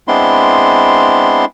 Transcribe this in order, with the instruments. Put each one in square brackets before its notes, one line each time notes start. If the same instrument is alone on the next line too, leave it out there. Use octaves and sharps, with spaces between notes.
[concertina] G#3 B3 C4 D4 E4 C6